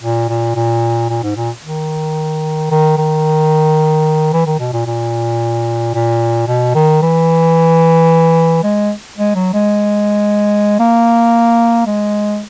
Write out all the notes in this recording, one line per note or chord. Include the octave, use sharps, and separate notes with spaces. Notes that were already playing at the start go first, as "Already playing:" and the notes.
A#2
A#2
A#2
A#2
G#2
A#2
D#3
D#3
D#3
E3
D#3
B2
A#2
A#2
A#2
B2
D#3
E3
G#3
G#3
F#3
G#3
A#3
G#3